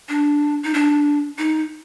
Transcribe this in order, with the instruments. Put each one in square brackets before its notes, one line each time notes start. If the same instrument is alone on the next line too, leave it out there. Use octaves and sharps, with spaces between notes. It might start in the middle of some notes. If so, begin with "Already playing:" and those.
[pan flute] D4
D#4
D4
D#4